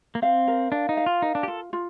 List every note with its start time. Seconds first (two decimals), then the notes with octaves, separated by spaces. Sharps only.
0.15 A#3
0.22 C4 F5
0.47 A#4
0.72 D4 F5
0.89 D#4
0.97 F5
1.06 F4
1.22 D#4 A#4
1.35 D4
1.43 G4
1.48 F4 A4
1.73 F4